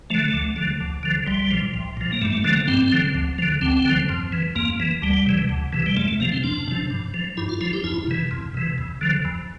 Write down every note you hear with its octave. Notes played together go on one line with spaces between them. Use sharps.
D3 F3 A3
D2
D3 F3
D2
D3 F3
C2 G3
A#2 F3
C2
A#2 F3
A#3
G2 A3
A3
D3 F3 A3
A#3
G2 C4
D3 F3
D2
D3 F3
D2 C4
D3 F3
F2
E3
F2 A#3
E3
D2 G3
C3 E3
D2
C3 E3
G3
F2 A3
A3
C3 F3 A#3
C4
F2 D4
C3 F3
G2
F3
G2 E4
F4
F3 E4
G4
F2 E4
C3 E3
F2
C3 E3
E2
D3 F3
E2